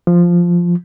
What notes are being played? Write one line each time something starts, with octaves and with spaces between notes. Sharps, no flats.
F3